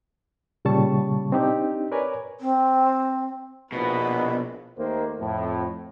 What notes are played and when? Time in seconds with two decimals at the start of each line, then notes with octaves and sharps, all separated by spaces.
0.65 A#2 C#3 G3 A5 C#6
1.32 C4 D4 D#4 G4
1.92 A#4 B4 C#5 D5 G#5
2.40 C4
3.72 A#1 B2 B3 E4 B4
4.78 D#2 D#3 A3 A#3 A#4 C5
5.19 F2 A2